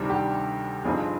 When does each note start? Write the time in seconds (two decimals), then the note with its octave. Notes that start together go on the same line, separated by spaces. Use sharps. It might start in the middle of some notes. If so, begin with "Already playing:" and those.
Already playing: D2 C3 D#3 G3 D4
0.10 G4
0.84 G1 G2 F3 C4 D#4 G#4